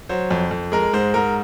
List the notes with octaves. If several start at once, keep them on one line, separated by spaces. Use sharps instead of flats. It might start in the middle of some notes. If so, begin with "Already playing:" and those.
F#3 C5
F2
F2
G#3 A#4
G#2 C5
G#2 A#4